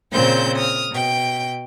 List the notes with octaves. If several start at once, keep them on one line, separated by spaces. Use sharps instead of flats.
A#2 C#3 C4 C5 G6
D#6 F6
B2 G5